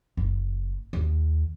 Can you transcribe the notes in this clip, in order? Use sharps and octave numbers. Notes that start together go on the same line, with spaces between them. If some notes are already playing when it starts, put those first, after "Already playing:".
F#1
D#2